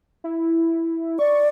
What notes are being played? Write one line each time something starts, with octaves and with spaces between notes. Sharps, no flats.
E4
D5 C#6